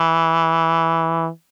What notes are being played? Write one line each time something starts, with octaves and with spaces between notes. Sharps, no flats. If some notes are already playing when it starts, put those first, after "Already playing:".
Already playing: E3